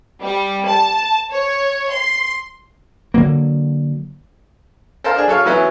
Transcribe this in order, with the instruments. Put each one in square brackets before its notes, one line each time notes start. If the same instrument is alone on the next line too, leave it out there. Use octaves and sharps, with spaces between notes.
[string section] G3
A5
C#5
C6
[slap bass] D3 F#3 A#3
[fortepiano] A4 A#4 C5 F5 A5
D4 G#4
F#3 A4 C#5 F5
E3 F#3 B3 C#4 E4